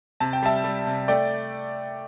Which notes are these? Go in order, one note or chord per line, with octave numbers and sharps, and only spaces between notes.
C3 A5
G5
G3 E5 A5
G3
C3
A3 D5 G5